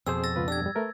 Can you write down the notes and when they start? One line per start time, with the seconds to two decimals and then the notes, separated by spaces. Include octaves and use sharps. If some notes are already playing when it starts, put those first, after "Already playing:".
0.07 F2 B2 C4 G#4 C5 E6
0.24 E6 A6 A#6
0.36 C#2 F4 B4
0.48 D4 G4 E6 G#6
0.62 G2 G3
0.75 A3 A#4 B4